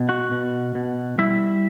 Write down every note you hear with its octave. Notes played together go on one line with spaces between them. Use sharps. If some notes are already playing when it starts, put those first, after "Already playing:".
Already playing: B2
F#4 F#5
B2
B2
G3 E4 E5